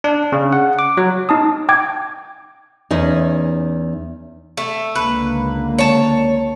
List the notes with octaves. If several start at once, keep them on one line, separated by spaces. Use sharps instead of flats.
D4
C#3
F#5
D6
F#3
D#4 A5 D#6
G5 D6 G#6
E2 C#4 D#4
A3
C#2 D3 A#3 B4
C#5 A5